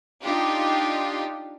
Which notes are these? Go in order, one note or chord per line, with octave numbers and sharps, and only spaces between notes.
D4 D#4 F4 G4